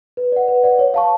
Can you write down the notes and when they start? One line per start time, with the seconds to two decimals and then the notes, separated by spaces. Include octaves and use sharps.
0.17 B4
0.32 D5 F#5
0.48 B4
0.64 D5 F#5
0.79 C#5
0.94 F5 A5 C#6